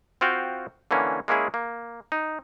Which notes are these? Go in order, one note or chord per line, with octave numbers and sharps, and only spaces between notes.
C4 F4 F#4 F5 G5
D3 E3 A#3 C#4
G#3 A#3 C#4 E4 G#4
A#3
D#4